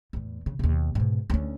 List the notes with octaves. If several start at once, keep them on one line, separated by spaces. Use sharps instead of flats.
E2 A2
C#3
D#2 B2
G#2 B2
D2 C#4